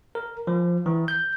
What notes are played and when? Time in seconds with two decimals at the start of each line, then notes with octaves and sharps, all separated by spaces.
0.15 A#4
0.47 F3
0.86 E3
1.08 G6